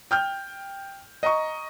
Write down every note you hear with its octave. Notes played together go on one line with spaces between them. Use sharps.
G5 F6 G6
D#5 A#5 C#6